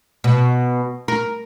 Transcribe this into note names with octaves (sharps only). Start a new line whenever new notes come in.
B2
A#4